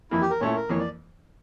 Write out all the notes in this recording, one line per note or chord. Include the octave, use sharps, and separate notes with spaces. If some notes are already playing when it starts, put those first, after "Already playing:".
F2 E3 A#3 E4
G4
A#4
A#2 A3 C#4 E4 C#5
A#4
F2 E3 A#3 C#5
D5